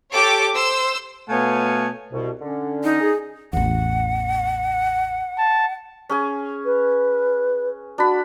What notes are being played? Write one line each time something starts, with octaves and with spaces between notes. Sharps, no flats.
G4 A4 C#5 D6
C5 E6
B2 A3 B3 C#5 F5 G#5
C2 B2
D3 C#4
D#4
G#4
A1 E2 F#5
A5
C#4 G#4 G#5
B4
D4 F#4 B5